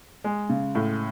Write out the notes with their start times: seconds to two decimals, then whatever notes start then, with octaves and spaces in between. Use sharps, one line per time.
0.24 G#3
0.49 C#3
0.75 A2